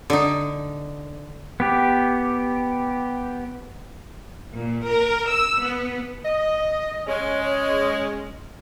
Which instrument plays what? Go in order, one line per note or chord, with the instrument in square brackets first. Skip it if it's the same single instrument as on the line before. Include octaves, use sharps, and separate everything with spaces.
[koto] D3 D#4
[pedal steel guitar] B3 G4
[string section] A#2
A#4
E6
B3
[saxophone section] D#5
G#3 C#4